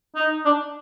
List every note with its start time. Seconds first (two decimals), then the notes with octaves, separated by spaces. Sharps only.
0.16 D#4
0.46 D4